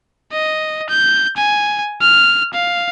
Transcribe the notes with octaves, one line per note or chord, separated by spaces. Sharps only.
D#5
G6
G#5
F6
F5